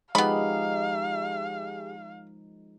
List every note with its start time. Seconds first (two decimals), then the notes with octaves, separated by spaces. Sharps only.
0.15 F3 G#3 B3 D#4 G4 G#4 F5 B5